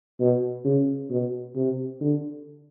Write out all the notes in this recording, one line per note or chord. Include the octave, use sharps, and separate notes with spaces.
B2
C#3
B2
C3
D3